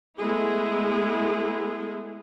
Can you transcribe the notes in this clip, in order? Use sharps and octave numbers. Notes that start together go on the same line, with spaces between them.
G#3 A3 B3 E4 G#4